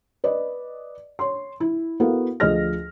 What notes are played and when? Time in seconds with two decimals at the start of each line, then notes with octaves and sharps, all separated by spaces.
0.24 B4 D5 D#5
1.19 C#5 C6
1.60 E4
2.00 B3 E4 F#4 A4 A#4 F5
2.40 D2 F3 G#4 D#5 F6 A#6